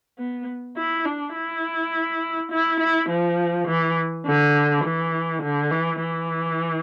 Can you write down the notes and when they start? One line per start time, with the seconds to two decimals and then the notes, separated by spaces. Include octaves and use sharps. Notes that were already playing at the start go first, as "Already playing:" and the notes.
0.18 B3
0.76 E4
1.05 D4
1.35 E4
2.51 E4
2.80 E4
3.09 F3
3.67 E3
4.26 D3
4.84 E3
5.42 D3
5.71 E3
6.01 E3